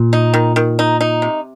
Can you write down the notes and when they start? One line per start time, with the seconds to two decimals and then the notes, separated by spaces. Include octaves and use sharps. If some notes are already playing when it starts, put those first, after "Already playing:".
Already playing: A#2
0.13 D#4
0.34 D#3
0.56 D#3
0.79 D#4
1.01 D#4
1.22 C3